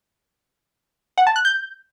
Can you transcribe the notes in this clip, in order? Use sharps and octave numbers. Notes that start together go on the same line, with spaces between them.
F#5
A5
F#6
G6